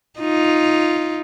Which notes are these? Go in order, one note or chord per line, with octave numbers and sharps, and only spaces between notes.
D#4 F4